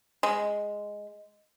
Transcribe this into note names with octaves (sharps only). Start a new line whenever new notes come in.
G#3